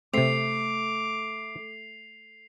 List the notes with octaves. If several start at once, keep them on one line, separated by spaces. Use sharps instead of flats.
C3 A3 C4 D6 C7 F7